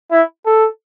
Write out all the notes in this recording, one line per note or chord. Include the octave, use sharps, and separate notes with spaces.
E4
A4